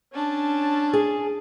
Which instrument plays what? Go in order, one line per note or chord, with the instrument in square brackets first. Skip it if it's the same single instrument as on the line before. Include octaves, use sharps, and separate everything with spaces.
[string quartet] C#4 D4 A5
[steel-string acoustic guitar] G#4